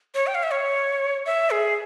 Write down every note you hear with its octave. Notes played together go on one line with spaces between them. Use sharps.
C#5
G5
F5
E5
C#5
E5
G#4